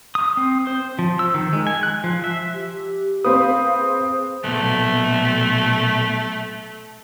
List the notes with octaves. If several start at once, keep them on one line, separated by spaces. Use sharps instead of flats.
D#6
C4
C5
F3
E6
D#3
G#3
G#5
F#6
F3
E5
G4
C4 B4 C5 F5 D#6
G#4
B1 A#2 A3 B3